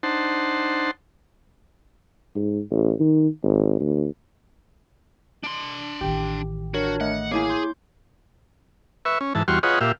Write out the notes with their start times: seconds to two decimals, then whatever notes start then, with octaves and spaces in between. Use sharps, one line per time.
0.03 D4 D#4 C5 F#5 A5 C6
2.35 G#2
2.71 A1
3.00 D#3
3.44 G#1
3.80 D2
5.43 D4 C6
6.01 A1 D#3 G4
6.74 D4 F#4 A#4 C#5
7.01 A3 D#5 F#5
7.31 A#3 E4 G#4 C#5 G#5 D6
7.49 C6 G6
9.05 B4 E5 C#6
9.21 C#4
9.35 G#2 E3 A5
9.48 E2 G3 F#4 C6 C#6 F6
9.63 F4 G#4 B4 C#5 D#5 F#5
9.81 A#2 G4 E5 F5